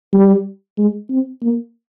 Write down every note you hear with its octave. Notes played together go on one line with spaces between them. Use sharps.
G3
G#3
C4
A#3